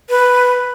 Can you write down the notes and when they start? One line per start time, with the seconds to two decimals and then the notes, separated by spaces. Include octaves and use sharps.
0.09 B4